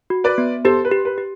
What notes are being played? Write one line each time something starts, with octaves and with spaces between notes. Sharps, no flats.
F#4
B4 D5
B3
G4 A4 C5
B4
G4
B4
G4